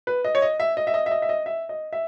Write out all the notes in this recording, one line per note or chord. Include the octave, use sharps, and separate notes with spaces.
B4
D#5
C#5
D#5
E5
D#5
E5
D#5
E5
D#5
E5
D#5
E5
D#5
E5